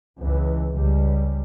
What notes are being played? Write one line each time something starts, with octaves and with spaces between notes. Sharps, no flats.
C#2 E3
C#2 G3